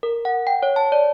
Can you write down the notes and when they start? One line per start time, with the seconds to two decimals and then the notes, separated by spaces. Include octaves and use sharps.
0.03 A#4
0.25 F#5
0.47 G5
0.63 C#5
0.76 A5
0.92 D5